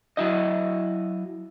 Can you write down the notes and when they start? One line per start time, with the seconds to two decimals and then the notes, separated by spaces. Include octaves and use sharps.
0.17 F#3 E4 D#5